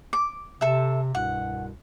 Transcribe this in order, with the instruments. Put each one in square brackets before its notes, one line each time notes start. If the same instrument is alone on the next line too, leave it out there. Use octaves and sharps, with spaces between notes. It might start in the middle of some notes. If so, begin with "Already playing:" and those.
[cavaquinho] D6
[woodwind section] C3 [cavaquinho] A4 E5
[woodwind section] C2 G2 B2 [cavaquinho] F#5